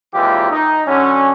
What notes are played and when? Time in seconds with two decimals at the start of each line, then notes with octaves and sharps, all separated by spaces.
0.14 G#1 D#2 E3 F4 G4
0.51 D#4
0.87 D3 F#3 C#4